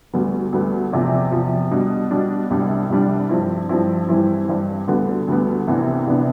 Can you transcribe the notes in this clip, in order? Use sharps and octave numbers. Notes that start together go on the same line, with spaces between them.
D2 D3 G3 B3
D2 D3 G3 B3
E2 C3 F3
E2 C3 F3
B2 G3 D4
B2 G3 D4
C2 C3 G3 D4
C2 C3 G3 D4
G2 F3 C4 E4
G2 F3 C4 E4
G2 E3 G3 C4 E4
G2 E3 G3 C4 E4
D2 D3 G3 B3
D2 D3 G3 B3
C2 C3 E3 B3 D4
C2 C3 E3 B3 D4